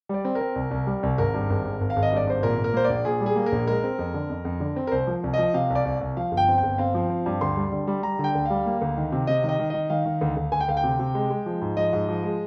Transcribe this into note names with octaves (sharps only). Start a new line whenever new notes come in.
G3 D5
C4
A#4
C4
C2
C2
G3
C2
G#1 A#4
G2
G#1
G#1
G#1
F5
G#1
D#5
G2 D5
G#1 C5
A#2 A#4
A#2
A#4
A#3 C5
D5
A#1
A#2 G#4
G3
G#4
A#3
A#4
A#1
G#3 A#4
C4
F2
D3
F2
F2
D3
C4
A#4
C2 C5
F3
C2
F3 D#5
C3 F5
C2
D5
C2
C2
F3 F5
G1
G5
C4
G5
G1
C4 F5
F3
C4
G2
D2 C6
G3
D3
G3
G3 A#5
D3
G5
D2
G3 F5
A#3
D2
D#3
C3
C3 D#5
D#3
D#5
D#3
D#3 D#5
D#3 F5
D#3
D2
D2
D2 G#5
G5
D2 F5
G5
C3
C3
G#3
G#3
F3
G#2
F3 D#5
G#2
F3
G#3